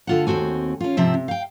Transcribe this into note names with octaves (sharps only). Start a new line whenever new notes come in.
D3 F4 F#5
D#2 B2 C4 F#4 G#5
C#4 F4
G#2 C3 F3 C4 E5
C3
F5 G5